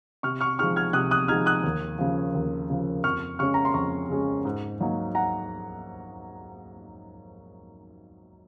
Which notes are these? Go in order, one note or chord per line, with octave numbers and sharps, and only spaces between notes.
C3 C#6 F6
C#6 F6
F3 G#3 D#4 C#6 F6
F6 G#6
C3 D#6 F#6
D#6 F#6
F3 G#3 D#4 F6 G#6
D#6 F#6
D#2
C#3 F3
D#2
C#3 F3
F2 C#6 F6
C#3 G#3 C#4 C#6 F6
A#5
C6
F2 A#5 C#6
C#3 G#3 C#4
G#2
F#3 A#3 D#4
F#5 A#5